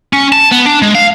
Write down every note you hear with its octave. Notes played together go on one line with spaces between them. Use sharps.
C#4
A5
B3
D4
G#3
F5